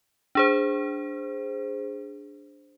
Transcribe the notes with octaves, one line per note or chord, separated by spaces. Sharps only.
D4 G#4 C5